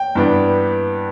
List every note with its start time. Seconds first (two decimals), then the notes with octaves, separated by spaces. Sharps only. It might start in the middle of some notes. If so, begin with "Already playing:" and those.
Already playing: G5
0.15 G2 E3 B3 D4